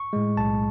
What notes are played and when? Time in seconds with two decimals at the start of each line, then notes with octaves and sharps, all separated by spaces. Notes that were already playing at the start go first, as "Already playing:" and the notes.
Already playing: C#6
0.13 A2 G#3
0.37 B1 A5